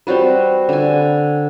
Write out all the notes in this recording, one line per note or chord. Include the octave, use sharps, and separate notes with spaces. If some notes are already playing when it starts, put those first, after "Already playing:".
G3 C4 F#4 B4
D3 G#5